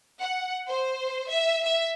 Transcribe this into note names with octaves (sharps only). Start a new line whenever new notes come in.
F#5
C5
E5
E5